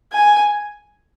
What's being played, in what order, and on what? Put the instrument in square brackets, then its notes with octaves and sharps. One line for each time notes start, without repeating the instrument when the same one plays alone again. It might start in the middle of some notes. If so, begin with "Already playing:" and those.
[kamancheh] G#5